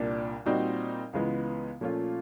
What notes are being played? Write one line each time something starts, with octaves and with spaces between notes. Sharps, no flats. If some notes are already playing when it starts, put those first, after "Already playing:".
Already playing: C2 A#2 G3 A#3 D4
A#2 G3 C4 D#4 F#4
C#2 C#3 E3 G#3 B3
A#2 F3 A3 C#4 F4